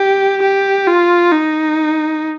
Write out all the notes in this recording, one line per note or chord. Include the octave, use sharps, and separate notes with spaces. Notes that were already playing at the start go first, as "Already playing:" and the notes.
Already playing: G4
G4
F4
D#4